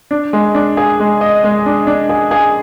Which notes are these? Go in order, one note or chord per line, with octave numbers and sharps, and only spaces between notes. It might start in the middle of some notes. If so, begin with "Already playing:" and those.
D4
G#3
D4
G#4
G#3
D#5
G#3
D4
D4
G#4
G#4